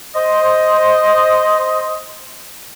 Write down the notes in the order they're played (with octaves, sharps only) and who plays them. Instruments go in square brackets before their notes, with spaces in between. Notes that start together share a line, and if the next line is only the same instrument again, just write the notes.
[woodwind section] C5 D#5